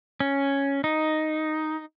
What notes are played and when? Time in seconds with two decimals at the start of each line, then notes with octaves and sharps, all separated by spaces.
0.20 C#4
0.84 D#4